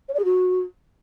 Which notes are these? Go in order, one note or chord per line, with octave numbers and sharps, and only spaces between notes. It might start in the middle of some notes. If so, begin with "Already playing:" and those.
C#5
D5
G#4
F#4